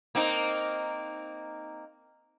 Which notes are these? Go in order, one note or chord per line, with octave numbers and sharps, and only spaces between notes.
A#3 C4 D#4